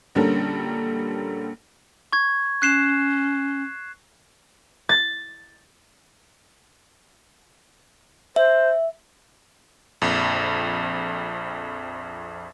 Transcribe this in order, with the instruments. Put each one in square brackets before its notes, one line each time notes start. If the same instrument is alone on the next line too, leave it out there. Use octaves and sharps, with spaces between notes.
[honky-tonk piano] A#1 D3 G3 C#4 A4 A#4
[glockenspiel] C#6 G#6
[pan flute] C#4 [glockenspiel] F#6 C7 E7
[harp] A6
[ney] C5 [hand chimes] E5
[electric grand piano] A#1 F2